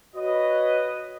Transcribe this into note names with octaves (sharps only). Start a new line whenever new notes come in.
F#4 B4 C#5 D#5